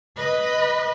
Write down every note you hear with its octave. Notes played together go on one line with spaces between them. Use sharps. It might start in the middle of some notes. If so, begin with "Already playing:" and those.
B4 D#5